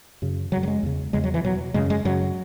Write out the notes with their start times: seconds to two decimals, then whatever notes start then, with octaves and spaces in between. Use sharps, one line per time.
0.22 F#2 C#3
0.52 C#3 F#3
0.57 F#2
0.63 F#3
0.68 G#3
0.83 E2 C#3
1.13 E2 C#3 G#3
1.24 F#3
1.34 E3
1.44 E2 B2 F#3
1.74 F#2 C#3 G#3
1.90 G#3
2.05 F#2 C#3 F#3